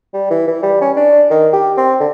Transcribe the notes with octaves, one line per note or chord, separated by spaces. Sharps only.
G3
E3
E3
G3
C#4
D4
D#3
G4
C4
D3